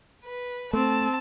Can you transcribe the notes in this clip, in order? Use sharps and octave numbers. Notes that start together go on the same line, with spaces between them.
B4
A3 C4 A5